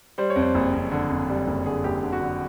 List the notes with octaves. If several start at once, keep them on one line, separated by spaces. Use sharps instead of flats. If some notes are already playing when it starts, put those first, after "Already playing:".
G3 C5
C#5
F2
C5
F#1
F2
D3
F2
G3
F#1
D3 G#4
F#1 G4
D3
F#4
D3